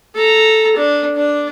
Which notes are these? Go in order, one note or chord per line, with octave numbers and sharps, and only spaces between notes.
A4 A#5
D4
D4